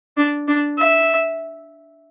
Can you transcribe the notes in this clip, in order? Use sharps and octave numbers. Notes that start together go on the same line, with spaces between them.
D4
D4
E5